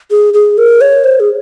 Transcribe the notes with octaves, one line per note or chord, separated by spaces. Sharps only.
G#4
G#4
A#4
C#5
C5
G#4